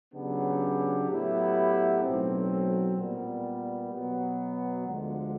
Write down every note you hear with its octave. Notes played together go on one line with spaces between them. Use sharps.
C#3 F#3 B3 D4 G4
A2 F#3 B3 E4 G4
B1 A2 F#3 A3 C4
A#2 G3 B3
B2 F#3 B3
D2 D3 F3 G#3